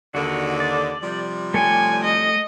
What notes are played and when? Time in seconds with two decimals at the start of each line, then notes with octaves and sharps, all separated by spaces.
0.15 D#2 D3 F#4
0.60 D5
1.02 C3 F3 G3
1.54 A3 C#5 G5 G#5
2.04 D#5